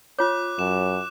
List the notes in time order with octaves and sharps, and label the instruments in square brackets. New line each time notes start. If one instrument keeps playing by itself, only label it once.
[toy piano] F4 C#5 [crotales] D6 F#6
[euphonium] F#2 [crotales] E7